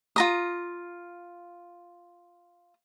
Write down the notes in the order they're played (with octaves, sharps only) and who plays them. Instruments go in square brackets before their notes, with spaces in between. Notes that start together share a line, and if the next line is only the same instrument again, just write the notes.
[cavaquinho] F4 A#5 D#6